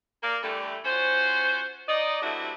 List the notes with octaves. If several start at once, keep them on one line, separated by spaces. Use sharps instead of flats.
A#3 D5 F5
D3 E3 G3 A3
C#4 F4 F#4 C5
D#4 D5 D#5
G2 C3 A3 D4 E4 F#4